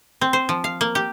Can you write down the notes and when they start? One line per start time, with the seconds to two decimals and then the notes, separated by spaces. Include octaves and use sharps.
0.21 C4
0.33 C5
0.49 F3
0.64 F5
0.81 A#3
0.95 G4